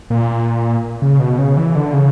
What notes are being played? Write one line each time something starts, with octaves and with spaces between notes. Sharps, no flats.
A#2
C#3
B2
C#3
E3
D3
C#3